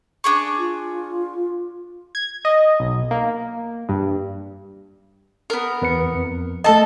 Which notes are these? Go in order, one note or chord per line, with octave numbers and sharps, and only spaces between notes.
D4 G#4 C#6
F4
G#6
D#5
B1
A#3
G2
B3 A#4
E2 B4 C#7
F2
A3 A4 D#5 A5